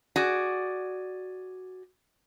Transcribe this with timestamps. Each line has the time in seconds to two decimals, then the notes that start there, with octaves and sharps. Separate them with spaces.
0.16 F#4 G#4 D5